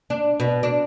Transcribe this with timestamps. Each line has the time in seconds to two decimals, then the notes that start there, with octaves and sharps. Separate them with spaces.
0.10 D4
0.40 B2
0.63 D4